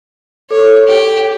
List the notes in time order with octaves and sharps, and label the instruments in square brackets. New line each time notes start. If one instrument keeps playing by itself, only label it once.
[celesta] A4 [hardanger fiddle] C#5
[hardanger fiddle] G4